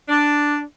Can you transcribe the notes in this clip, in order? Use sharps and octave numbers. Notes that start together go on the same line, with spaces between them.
D4